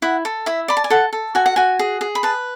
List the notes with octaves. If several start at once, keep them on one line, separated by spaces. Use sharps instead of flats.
E4 F#5
A4
E4 E5
D5 B5
A5
G#5
A4 F#5
A4
F#4 G#5
F#5
F#4 G#5
G#4
G#4
B5
B4 A5